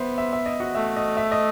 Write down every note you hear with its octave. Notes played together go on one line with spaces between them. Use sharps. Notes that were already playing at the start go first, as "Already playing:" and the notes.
Already playing: B3 C5 E5 C6
E5
E5
D#5
F#4 F#5
A3 E5
D#5
E5
D#5